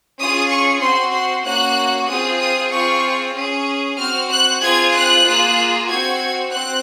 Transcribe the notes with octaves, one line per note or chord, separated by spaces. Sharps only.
C#4 F4 G#4 D#6
C#6
C4 F#4 C6
C6
A#3 C#4 F#4 F#6
C4 F4 G#4 D#6
D#6
C4 F4 G#4 C#6
C#4 G#4
C4 F#4 F6
F#6
C4 F4 G#4 G#6
F#6
A#3 F4 G#4
C4 F#4 G#6
C4 F#6